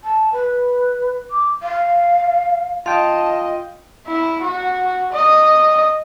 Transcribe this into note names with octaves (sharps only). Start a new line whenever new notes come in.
A5
B4
D6
F5
F4 D#5 F5 G5 A5
E4
F#4
D#5